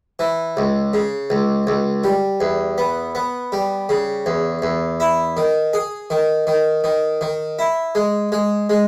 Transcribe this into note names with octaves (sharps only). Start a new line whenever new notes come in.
E3
C#2
C#3
C#2
C#2
G3
E2
B3
B3
G3
C#3
E2
E2
E4
D#3
G#4
D#3
D#3
D#3
D#3
E4
G#3
G#3
G#3